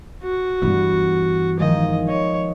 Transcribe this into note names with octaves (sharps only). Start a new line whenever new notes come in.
F#4
G2 E3 B3
D#3 F3 G#3 D#5
C#5 D#5